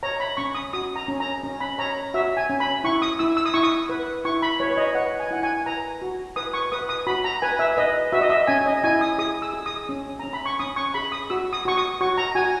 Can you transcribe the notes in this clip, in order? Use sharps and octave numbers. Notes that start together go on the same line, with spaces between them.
C#5 A#5
B5
C#4 C#6
D#6
F#4 D#6
A#5
C#4
A#5
C#4
B5
C#5 A#5
F#4 E5
G#5
C#4
B5
E4 C#6
D#6
E4 E6
E6
D#6
E4 C#6
D#6
B4
E4 C#6
B5
B4 C#5
C#5
D#5
B4 F#5
G#5
E4 F#5
G#5
B4 A#5
F#4
B4 D#6
C#6
B4 D#6
D#6
F#4 B5
A#5
B4 G#5
E5
B4 D#5
F#4 E5
D#5
E5
C#4 G#5
D#5
E4 G#5
D#6
G#4 D#6
E6
G#4
D#6
C#4
C#4 A#5
B5
C#6
C#4 D#6
C#6
G#4 B5
D#6
F#4 E6
D#6
F#4 C#6
D#6
F#4 C#6
A#5
F#4 G#5